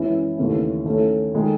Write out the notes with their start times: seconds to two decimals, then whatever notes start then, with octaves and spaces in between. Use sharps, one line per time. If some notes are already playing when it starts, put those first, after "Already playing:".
Already playing: F#2 E3 G#3 C#4 E4
0.38 D#2 C#3 E3 A3 C#4
0.85 D#3 A3 C#4 E4 A4
1.34 D#3 G#3 D#4 A4